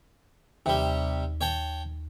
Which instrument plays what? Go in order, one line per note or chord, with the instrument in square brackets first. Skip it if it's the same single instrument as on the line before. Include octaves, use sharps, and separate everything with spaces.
[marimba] D#2 [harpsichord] C3 G3
[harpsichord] C#5 G5 A5